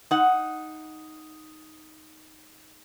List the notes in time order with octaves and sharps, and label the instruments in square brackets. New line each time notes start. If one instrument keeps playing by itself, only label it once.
[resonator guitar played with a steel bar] D#4 F#5